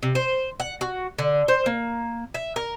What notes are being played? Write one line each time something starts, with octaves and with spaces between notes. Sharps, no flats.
C3
C5
F#5
F#4
D3
C5
A#3
E5
A#4